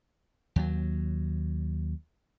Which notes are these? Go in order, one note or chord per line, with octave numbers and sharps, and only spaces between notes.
D#2 F#3